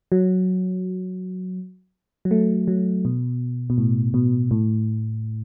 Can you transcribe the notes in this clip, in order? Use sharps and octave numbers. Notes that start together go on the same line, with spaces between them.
F#3
F#3
A3
F#3
B2
B2
A2
B2
A2